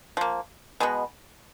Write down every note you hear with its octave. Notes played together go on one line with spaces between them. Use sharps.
F3 A#3
B2 G#3 B3